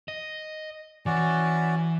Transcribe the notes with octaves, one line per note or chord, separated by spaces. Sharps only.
D#5
E3 C#4 F#4 D5